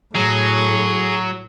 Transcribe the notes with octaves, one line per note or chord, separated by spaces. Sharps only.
A2 F#3 G#4